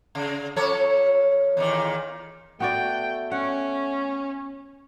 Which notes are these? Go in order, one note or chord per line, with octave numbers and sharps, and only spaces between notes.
C#3
F3 A4 C#5
E2 A#2 D#3
A3 B3 F#4 D5 G5
C#4 F#5